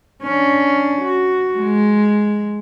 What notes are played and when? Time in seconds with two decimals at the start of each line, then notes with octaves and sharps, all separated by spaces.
0.23 C#4 D4
1.02 F#4
1.58 G#3